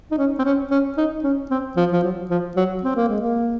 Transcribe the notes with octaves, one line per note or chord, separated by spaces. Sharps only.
D#4
C#4
C4
C#4
C#4
D#4
C#4
C4
F3
F3
F#3
F3
F#3
C4
A#3
G#3
A#3